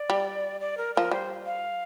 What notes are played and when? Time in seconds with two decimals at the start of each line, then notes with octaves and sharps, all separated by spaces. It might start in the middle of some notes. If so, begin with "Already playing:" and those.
Already playing: D5
0.10 G3
0.61 D5
0.77 A#4
0.95 F3 A#4
1.11 G3 C5
1.46 F5